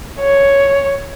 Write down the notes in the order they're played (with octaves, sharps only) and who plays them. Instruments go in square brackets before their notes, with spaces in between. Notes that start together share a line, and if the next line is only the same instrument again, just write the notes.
[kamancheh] C#5